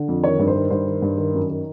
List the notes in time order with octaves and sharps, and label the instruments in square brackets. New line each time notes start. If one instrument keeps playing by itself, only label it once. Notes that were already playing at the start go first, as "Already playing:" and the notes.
Already playing: [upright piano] D3
F2
D#3 C#5
G2
C5
D#3
G2 C5
D#3
G2
D#3
F#2
D#3